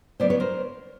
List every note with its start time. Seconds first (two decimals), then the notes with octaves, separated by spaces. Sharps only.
0.20 C#3 F#3 B3 E4 C5 D5
0.30 B4 C#5
0.40 A#4 C5